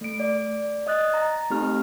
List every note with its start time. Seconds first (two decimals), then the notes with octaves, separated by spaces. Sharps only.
0.01 A3 D7
0.20 D5
0.87 D#5 D#6 F#6 A6
1.14 A#5
1.50 A3 C4 D#4 G4 F6